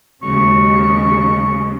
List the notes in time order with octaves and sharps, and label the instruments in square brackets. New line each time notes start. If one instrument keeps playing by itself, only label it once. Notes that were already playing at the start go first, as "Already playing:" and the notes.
[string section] D#2 C#3 [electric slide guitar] F#3 G#3 [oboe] C#6